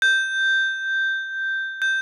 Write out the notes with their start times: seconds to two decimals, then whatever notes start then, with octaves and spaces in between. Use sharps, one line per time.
0.02 G6
1.82 G6